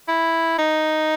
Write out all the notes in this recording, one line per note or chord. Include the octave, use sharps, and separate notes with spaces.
E4
D#4